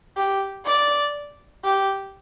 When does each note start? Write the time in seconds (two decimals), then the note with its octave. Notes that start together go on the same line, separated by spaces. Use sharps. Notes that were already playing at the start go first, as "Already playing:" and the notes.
0.17 G4
0.65 D5
1.64 G4